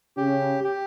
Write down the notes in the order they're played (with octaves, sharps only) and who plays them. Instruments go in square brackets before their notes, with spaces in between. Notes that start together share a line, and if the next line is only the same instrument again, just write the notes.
[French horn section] C#3 C#4 [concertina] G4
[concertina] G4